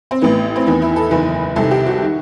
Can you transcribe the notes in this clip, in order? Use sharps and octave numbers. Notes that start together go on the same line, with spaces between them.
C4
A1 A2 E3 B3
C4
E2 D#3 B3
E4
A4
F#1 E2 D#3 B4
C2 C3 D#3 A4
G4
F#4
D#3